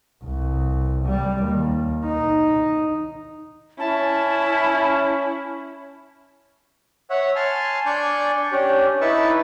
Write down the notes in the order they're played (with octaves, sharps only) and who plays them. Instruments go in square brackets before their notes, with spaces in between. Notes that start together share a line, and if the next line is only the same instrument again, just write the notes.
[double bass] C2
G3
D#2
D#4
[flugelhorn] C#4 [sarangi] E4 [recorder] A5
[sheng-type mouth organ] C#5 E5 F#5
G#5 A5 C6 F6
D4 D5 G#5 C#6 G6
C#4 D4 G4
D#4 E4 B4 E5 A5 C#6